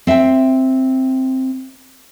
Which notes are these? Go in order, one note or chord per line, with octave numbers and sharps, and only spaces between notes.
C4 E5 F#5 G5